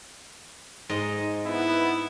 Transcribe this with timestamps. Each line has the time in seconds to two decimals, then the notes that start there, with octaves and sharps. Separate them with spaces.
0.89 G#2 D#5
1.46 B3 E4